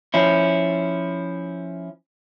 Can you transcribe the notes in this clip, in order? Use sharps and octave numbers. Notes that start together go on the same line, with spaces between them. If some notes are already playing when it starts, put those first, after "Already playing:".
F3 C#4 E4